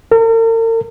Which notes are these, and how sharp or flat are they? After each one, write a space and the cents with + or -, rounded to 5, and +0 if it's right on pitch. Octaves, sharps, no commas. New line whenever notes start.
A#4 -45